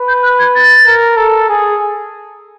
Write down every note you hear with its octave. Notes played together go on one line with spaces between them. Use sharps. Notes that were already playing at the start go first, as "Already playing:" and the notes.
Already playing: B4
G6
F#6
G#6
A6
A#4
A4
G#4